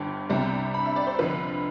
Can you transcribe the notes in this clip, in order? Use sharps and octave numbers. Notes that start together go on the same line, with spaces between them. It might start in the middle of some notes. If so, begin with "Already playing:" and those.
Already playing: G1 G2 D3 G5
C2 C3 G3 D4
B5
E5
D5
C5
F2 D3 F3 B4